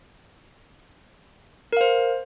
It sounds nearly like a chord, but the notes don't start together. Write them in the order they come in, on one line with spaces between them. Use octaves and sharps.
A#4 F5 C5